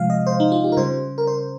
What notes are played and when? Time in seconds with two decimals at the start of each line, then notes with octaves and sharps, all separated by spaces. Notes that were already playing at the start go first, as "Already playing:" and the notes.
Already playing: C3 F3 G#3 F5
0.10 D#5
0.27 C5
0.40 D#4
0.52 F4
0.64 G4
0.72 A#4
0.77 C#3 G3 C5
1.18 A#4
1.27 C5